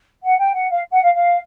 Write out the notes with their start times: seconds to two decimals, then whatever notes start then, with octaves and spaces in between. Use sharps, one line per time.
0.24 F#5
0.39 G5
0.54 F#5
0.69 F5
0.90 F#5
1.02 F5
1.13 F5